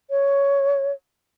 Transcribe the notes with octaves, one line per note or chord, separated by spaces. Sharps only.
C#5